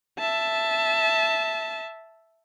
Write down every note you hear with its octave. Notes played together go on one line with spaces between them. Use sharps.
E5 A5